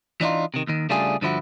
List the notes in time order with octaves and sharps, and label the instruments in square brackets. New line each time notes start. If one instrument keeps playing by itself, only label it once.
[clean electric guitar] E3 D4 D#4 F4
C3 D#3
D#2 D#3
C#3 G3 A3 D4 F4 G#4
G2 D3 F3 E4 F#4